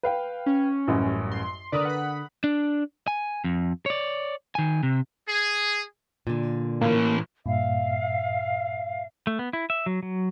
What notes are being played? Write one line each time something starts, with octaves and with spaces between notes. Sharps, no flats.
B4 F5 G5
C#4
A1 F#2 G3
C6
D3 A#4 B4 D5 D#6
F#5 B5
D4
G#5
F2
C#5 D5
D#3 G#5
C3
G#4
A#2 D3
A2 E3 A#3
G2 A#2 E5 F5
A3
B3
E4
E5
F#3
F#3